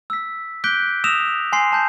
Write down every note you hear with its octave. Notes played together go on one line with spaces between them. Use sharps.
E6 B6
D6 F#6 G6 B6 D7 G7
D#6 E6 A#6 E7 F7
G#5 C6 C7
G#5 A5 G6 C7